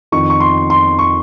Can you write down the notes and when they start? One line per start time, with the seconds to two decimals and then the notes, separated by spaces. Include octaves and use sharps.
0.12 F2 D#3 C#6
0.30 C#6
0.40 C6
0.70 C6
0.99 C#6